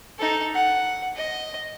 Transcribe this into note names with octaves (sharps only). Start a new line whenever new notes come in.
D#4 A4
F#5
D#5